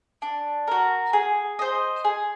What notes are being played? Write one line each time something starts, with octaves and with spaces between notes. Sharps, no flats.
D4
F#4 A#4
G#4
C5 D#5
G#4